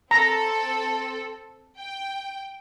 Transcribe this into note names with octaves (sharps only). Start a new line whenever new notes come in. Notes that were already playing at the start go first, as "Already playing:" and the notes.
C4 A4 A#5
G5